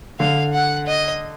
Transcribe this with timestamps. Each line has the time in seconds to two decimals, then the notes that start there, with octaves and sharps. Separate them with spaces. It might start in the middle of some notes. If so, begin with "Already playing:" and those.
0.20 D3 F5
0.53 F#5
0.86 D#5